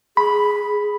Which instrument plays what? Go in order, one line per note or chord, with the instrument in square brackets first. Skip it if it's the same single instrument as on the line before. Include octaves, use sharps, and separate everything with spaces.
[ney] G#4 [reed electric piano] B5